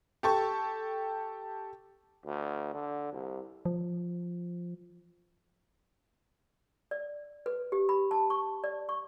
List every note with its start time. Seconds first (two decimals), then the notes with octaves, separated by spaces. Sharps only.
0.23 G4 A4 C#6
2.26 D2
2.74 D3
3.13 C2
3.65 F3
6.91 D5
7.46 B4
7.72 G4
7.89 B5
8.11 A5
8.30 C#6
8.64 D5
8.89 C#6